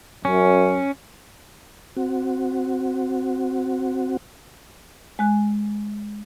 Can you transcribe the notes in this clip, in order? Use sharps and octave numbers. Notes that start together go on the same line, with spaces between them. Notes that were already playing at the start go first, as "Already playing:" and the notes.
F#2 C#4
C4 F#4
G#3 G#5 F#6